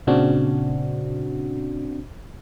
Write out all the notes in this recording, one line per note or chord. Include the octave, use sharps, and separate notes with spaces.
A#2 C#3 C4 D4 F#4